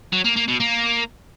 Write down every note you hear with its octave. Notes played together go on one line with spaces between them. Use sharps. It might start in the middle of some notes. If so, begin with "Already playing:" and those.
F#3
A#3
A#3
B2
A#3